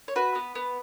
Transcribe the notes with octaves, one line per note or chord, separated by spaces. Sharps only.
C#5
F#4 B4
B3
B3